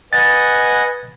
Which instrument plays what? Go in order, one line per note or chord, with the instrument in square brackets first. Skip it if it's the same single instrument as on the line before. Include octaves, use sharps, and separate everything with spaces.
[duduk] B4 [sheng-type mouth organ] D#5 F#5 G#5 [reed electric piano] A6